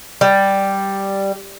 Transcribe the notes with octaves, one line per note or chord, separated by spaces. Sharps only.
G3